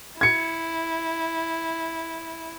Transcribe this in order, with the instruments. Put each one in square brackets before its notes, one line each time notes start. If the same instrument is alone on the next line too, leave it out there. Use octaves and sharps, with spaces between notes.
[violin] E4 [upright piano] G#6 C#7